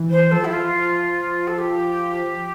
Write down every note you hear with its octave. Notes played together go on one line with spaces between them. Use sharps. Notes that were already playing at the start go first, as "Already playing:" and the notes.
Already playing: E3
C5
F3 A4
E4
F4
A4
G4